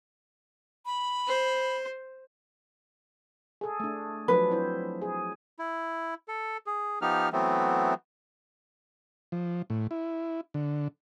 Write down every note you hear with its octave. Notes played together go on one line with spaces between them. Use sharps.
B5
C5
G#4 A4
A3 D4
F3 F#3 D4 B4
C4 E4 C5
G#4
E4
A4
G#4
F3 B3 D#4 G4 F6
E3 F#3 A3 B3 C4
F3
A2
E4
D3